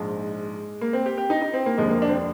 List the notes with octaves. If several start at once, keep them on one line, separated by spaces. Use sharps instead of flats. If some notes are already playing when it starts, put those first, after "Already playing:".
Already playing: A#1 G#2 F3 G#3
A#3
C4
G4
G4
D#4
D#4
C4
A#3
F1 D#2 D3 F3 G#3
A#3
D4
C4
D4